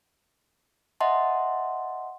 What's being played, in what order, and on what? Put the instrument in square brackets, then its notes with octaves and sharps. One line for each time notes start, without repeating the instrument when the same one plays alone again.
[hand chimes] D#5 E5 F#5 A5 C6